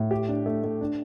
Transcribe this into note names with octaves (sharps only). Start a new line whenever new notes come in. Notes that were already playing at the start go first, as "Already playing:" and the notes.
Already playing: A2
G4
D4
A3
A3
D4